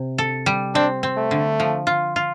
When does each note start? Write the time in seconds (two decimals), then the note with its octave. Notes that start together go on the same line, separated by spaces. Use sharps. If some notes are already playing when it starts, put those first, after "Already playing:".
Already playing: C3
0.18 A4
0.46 G3
0.74 C4 D4
1.03 C4
1.17 A3
1.31 D3
1.60 F3
1.87 F4
2.16 F4